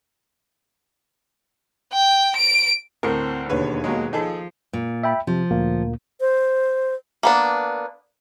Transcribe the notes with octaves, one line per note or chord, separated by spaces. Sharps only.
G5
D7
D2 A2 C4 A#4
E1 D#2 D3 B4 C#5
B2 F#3 G#3 A#3
F3 D#4 G#4 A4
A#2
E5 G5 B5
C3 F3
D2 A#2 A#3
C5
A#3 B3 D4